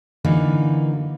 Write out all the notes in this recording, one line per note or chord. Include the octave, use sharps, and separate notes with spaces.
D3 E3 F#3 A#3 D#4